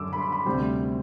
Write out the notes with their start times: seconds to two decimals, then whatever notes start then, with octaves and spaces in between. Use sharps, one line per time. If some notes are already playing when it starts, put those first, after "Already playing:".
Already playing: F#2 D3 G3 D6 E6
0.13 B5
0.19 C6
0.32 B5
0.46 D2 C3 G3 C4 C5